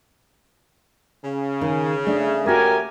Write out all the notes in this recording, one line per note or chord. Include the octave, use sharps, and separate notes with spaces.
C#3
D#3
A3 D4
A3 F#4 G4 A#4 G#5